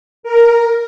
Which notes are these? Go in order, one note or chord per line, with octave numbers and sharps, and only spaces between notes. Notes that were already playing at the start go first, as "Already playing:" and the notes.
A#4